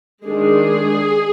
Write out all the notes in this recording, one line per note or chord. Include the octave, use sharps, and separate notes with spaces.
D#3 G#3 D4 G#4